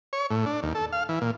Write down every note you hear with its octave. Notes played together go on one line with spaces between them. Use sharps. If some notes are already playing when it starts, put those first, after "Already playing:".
C#5
A2
D4
D#2
A4
F5
E3
A#2